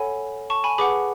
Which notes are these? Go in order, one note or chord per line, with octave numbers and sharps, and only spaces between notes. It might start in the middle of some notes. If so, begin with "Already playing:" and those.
Already playing: A4 C#5 F#5 G#5 B5
A5 C#6
G#5 B5
G#4 B4 F#5 B5 D6